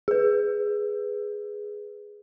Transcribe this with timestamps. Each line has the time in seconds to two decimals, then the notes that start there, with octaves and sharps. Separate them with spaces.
0.08 G#4 B4